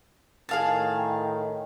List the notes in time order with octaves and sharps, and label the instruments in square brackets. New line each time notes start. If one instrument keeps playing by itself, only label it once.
[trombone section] A2 D#3 [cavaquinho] G#4 F5 A5